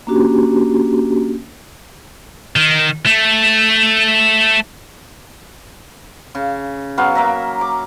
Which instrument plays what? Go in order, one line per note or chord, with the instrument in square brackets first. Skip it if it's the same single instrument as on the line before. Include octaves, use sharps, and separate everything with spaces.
[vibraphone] A#3 C#4 D4 F#4 G4
[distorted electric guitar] D#3
A3
[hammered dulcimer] C#3
F#3 B3 F5
A#3 E5 A#5
D6